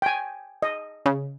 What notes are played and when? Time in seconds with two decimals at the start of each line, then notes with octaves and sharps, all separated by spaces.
0.02 G5 G#5
0.62 D#5
1.06 C#3